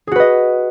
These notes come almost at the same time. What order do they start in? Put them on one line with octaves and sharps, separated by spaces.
G#4 F#4 B4 D#5